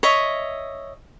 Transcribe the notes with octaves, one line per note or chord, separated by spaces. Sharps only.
C#5 D#5 E5